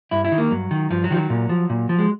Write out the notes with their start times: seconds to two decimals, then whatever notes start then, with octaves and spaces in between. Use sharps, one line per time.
0.11 G2 E4
0.25 E4
0.32 D#3
0.38 A#3
0.51 G2 F#3
0.71 D#3
0.90 G2 F3
1.04 F#3
1.10 D#3 F3
1.17 F#3
1.30 A#2
1.49 F3
1.70 A#2
1.89 F3
1.99 G#3